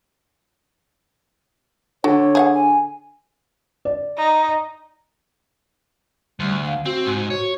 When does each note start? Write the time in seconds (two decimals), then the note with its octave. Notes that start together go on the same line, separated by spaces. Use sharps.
2.04 D3 F#4 C#5
2.35 G#4 F5 F#5
2.55 G#5
3.85 D5
4.18 D#4
6.40 D2 G3
6.66 F5
6.86 C4 F#4
7.06 G#2
7.30 F#4 C#5